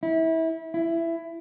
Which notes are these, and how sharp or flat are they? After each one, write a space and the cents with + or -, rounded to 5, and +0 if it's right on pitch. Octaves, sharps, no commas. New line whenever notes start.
E4 -25
E4 +15